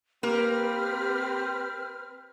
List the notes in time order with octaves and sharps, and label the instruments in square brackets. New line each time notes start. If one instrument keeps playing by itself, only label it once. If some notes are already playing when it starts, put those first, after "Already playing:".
[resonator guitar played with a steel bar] A#3 A#4 [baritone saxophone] C4 [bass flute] G4 [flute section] B4 F6